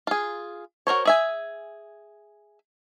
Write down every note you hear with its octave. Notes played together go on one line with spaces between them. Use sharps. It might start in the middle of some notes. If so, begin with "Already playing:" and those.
F4 G#4
F#4 A#4 C5 C#5
G#4 E5 G#5